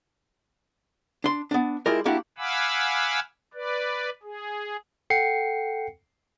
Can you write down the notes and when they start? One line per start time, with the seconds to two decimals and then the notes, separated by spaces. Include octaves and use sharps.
1.24 D4 C6
1.51 B3 D4
1.86 G#3 E4 F4 G4 A#4
2.05 A#3 D4 E4 F#4 G4
2.38 F5 F#5 G#5 B5 D6 E6
3.54 B4 D5
4.23 G#4
5.10 A4 F#5 G5 C7 C#7